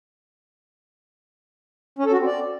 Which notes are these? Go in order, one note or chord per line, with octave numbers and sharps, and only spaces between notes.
C#4
A4
F#4
C4
D5